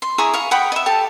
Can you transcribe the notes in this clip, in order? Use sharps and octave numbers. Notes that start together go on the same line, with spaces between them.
C6
E4 G#4 A#5 C#6
F5 C#6
F#5 G5 B5 D#6
D#5 E5
G4 A4 A5